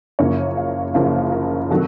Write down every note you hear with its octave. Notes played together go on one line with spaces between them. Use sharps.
F#1 F#2 C#3 F3 A#3 C#5
F5
F#1 F#2 C#3 F3 A#3 F5
A#4
C3 D#3 F#3 A4